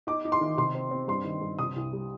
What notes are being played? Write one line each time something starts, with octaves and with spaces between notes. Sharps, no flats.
D#4 D6
D#4
C6
D#3
C3 C6
C4
C4
G2 C6
D#3
G2
C3 D#6
C2
G3